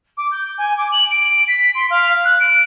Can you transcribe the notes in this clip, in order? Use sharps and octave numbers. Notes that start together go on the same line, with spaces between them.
D6
G6
G#5
D6
F#7
D7
B6
C6
F5
F#6
D7